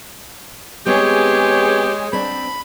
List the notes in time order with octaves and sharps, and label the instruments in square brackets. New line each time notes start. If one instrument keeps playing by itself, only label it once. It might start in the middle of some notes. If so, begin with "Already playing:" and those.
[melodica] G#3 [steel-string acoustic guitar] B3 C4 [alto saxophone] G4 [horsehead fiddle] G#4 C#5
[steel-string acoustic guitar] C4 D4 [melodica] B5